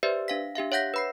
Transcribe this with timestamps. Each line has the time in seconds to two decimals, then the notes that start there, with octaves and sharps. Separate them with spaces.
0.03 G4 B4 C5 D5 E5
0.28 D4 F5 B6
0.55 D4 G4 E5 F5
0.72 C#5 E5 F#5 G6 A#6 B6
0.94 B4 B5 C7